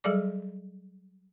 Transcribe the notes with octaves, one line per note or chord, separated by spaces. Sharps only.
F#3 G3 G#4 A4 D5 D6